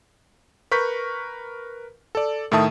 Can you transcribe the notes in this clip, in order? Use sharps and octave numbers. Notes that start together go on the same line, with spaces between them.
A#4 B4 C#6 G6 B6
A4 D5
A2 D#3 A3 E5 A5 D#6